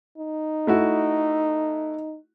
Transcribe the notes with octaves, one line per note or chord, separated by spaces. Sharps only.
D#4
A3 E4 F#4